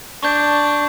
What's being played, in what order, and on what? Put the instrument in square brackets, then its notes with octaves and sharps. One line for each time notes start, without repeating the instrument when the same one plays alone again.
[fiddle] D4 [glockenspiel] C#6 G6